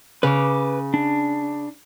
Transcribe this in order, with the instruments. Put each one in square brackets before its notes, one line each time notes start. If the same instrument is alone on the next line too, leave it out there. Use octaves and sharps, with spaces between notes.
[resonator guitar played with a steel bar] C#3 [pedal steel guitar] B4 D6
[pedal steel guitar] D4